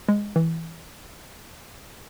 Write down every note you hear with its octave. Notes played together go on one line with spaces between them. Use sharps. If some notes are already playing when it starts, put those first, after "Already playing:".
G#3
E3